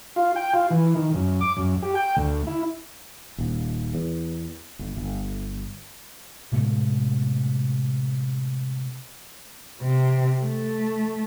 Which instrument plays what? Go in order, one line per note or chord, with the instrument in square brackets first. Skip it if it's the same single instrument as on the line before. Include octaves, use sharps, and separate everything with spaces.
[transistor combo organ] F4
G5
F4
E3
D#3
F#2
D6
F#2
G4
G5
D2
E4
[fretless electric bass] D#1
E2
G1
G1
[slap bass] A2 C3 G#3 A3
[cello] C3
A3